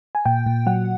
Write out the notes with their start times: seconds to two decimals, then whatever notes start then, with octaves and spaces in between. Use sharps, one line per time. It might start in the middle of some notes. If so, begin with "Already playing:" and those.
0.15 G#5
0.26 A#2 G5
0.46 A#2
0.66 F#3 F#5